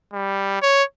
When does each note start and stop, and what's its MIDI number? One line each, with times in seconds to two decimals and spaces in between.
0.13 0.61 55
0.62 0.83 73